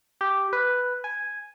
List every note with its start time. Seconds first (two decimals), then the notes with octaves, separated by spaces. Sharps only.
0.21 G4
0.53 B4
1.04 G#5